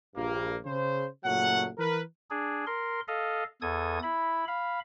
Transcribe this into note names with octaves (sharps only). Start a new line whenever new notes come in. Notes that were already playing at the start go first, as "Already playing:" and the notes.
A#1 G2 A#3
C#3 C5
F#1 A#2 F#3 A3 F#5
E3 A#4 B4
D4 G#4
A#4 C6
A4 D#5 F5
E2 A4 D#6 G#6
E4 B5
F5 B5